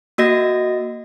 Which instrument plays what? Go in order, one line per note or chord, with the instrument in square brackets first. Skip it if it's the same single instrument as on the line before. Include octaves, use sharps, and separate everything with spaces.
[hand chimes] A#3 F#4 D#5 A#6